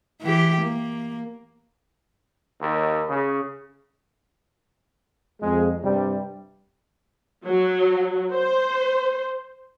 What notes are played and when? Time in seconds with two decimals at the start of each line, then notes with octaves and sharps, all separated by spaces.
0.22 E3 G4
0.62 A#3
2.61 D#2
3.10 C#3
5.41 F2 G#3
5.84 G2 C3 G3
7.45 F#3
8.33 C5